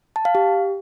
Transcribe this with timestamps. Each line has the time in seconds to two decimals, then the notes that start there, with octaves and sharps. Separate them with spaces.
0.16 A5
0.25 F5
0.35 G4